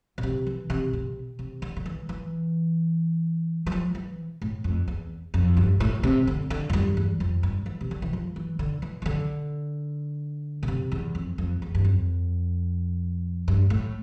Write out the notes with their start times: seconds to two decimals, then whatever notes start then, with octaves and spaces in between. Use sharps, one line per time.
0.18 B2
0.23 C3
0.47 E3
0.70 C3
0.93 C3
1.39 C3
1.62 D3
1.77 D3
1.86 E3
2.09 E3
3.66 E3
3.72 F3
3.95 E3
4.42 A2
4.64 F2
4.88 E2
5.34 F2
5.57 G2
5.80 A2
6.03 C3
6.27 D3
6.50 D3
6.70 F2
6.73 G2
6.97 E2
7.20 F2
7.43 G2
7.66 E3
7.81 C3
7.91 D3
8.02 E3
8.13 F3
8.36 E3
8.59 D3
8.82 E3
9.02 E3
9.06 D3
10.63 B2
10.68 C3
10.92 E2
11.15 F2
11.38 F2
11.62 E2
11.75 G2
11.85 F2
13.48 G2
13.70 A2